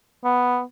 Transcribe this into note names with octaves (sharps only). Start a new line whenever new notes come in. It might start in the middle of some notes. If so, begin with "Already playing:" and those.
B3